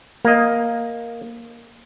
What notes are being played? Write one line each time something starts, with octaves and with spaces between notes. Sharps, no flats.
A#3 D#5